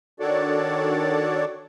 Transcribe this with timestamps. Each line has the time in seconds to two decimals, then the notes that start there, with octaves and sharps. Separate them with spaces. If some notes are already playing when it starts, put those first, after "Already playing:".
0.20 D#3 D4 F#4 A4 C#5 D5